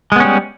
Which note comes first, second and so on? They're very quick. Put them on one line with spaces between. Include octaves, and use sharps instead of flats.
G#3 B3 C#4 G3